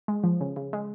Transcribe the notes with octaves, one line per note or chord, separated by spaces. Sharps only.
G#3
F3
C#3
C#3
G#3